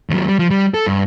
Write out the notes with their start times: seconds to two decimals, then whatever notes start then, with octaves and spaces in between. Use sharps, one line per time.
0.10 D#2 F#3
0.28 G3
0.39 F3
0.51 G3
0.74 A4
0.86 G2